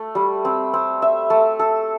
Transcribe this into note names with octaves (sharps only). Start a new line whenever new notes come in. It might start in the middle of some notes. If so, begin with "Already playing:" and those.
Already playing: A3
G3
C4
C4
E5
A3
A4